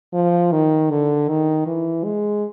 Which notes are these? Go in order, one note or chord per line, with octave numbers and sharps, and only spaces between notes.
F3
D#3
D3
D#3
E3
G#3